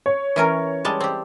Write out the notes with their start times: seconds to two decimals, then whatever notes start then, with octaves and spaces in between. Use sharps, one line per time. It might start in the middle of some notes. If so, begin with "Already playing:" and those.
0.06 C#5
0.36 E3 C#4 A#4
0.85 G3 G#3 A5
1.01 C4 G4